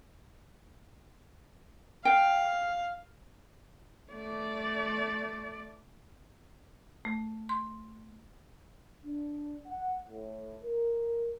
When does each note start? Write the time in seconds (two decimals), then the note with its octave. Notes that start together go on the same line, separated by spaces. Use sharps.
2.05 F5 G5
4.12 A3 D5
7.05 A3
7.49 C6
9.05 D4
9.67 F#5
10.08 A2
10.63 A#4